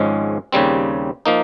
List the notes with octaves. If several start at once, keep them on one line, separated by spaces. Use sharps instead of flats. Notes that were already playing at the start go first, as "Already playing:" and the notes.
Already playing: G#1 G#2 F3 G#3 C#4
D#2 C#3 G3 C4
F3 A#3 D#4